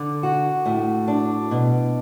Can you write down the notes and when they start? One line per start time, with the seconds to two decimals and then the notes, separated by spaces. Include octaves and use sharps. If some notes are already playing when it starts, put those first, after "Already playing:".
Already playing: D3
0.23 F#4
0.66 A2
1.08 D4
1.51 B2